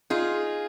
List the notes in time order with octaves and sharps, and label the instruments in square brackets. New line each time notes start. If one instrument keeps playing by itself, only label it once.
[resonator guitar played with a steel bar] D#4 F4 [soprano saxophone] G#4